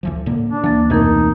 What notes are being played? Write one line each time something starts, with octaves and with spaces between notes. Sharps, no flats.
D2 E3 F3
A2 D3 A#3
D4
D2 E3 A#3 A6
F2 B2 E3 A3 C4 D#4 A#4